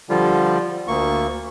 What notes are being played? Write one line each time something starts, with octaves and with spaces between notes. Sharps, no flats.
D3 F3 G3 F4
D2 A#3 C#6